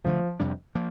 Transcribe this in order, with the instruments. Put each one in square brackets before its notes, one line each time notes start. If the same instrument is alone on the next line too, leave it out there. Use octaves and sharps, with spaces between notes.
[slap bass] D2 D3 A3 [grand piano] F3
[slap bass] F2 C3 G3 D4
F3 A#3